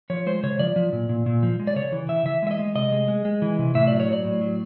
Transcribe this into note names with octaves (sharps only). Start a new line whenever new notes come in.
F3 C#5
G#3 C5
C#3 C#5
F3 D5
F3
A#2
A#2
A#2
F3
G#3
D5
C#3 C#5
E3
C#3 E5
E3 E5
G#3 E5
D#5
G#3
C3 D#5
G#3
G#3
G#3
E3
C3
A2 E5
F#3 D5
C#5
F#3 D5
A2
F#3